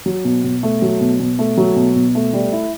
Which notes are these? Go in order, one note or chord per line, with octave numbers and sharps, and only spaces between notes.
F#3
B2
B2
A3
F#3
B2
B2
A3
F#3
B2
B2
A3
G3
E4